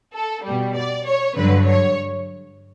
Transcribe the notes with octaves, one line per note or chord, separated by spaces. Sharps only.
A4
B2 G3
D5
C#5
G2 D3 F#3 B4
C#5